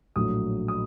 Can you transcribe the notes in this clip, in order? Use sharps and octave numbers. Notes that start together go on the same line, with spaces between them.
A#1 A2 F#3 D#6
D#6